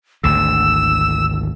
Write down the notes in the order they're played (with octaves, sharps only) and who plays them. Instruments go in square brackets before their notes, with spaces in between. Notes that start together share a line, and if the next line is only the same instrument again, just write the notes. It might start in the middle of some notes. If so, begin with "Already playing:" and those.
[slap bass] G#1 D2 D3 [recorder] E6